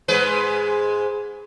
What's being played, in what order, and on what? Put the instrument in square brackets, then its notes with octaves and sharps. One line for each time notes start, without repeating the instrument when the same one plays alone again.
[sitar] G#2 G#3 B4